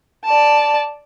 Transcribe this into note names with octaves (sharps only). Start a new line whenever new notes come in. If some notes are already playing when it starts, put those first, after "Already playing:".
D5 A5